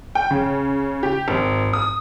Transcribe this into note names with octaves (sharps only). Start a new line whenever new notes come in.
G5
C#3
G4
G#1
D#6